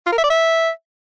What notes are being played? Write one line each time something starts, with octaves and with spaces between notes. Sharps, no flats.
F4
A#4
E5
D5
E5